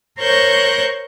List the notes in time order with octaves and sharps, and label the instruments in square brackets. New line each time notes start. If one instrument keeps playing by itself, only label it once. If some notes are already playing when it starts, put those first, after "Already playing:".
[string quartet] A#4 C5 C#5 C#6 F#6 G6